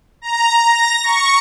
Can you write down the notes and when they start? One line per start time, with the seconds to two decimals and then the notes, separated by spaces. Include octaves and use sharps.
0.22 A#5
0.68 A#6
1.03 C#6